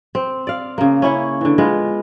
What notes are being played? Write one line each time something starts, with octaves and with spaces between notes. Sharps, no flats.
C4
D5 F5
C#3 A#3
C#4 E4 C#5
D3 E3
G#3 B3 F4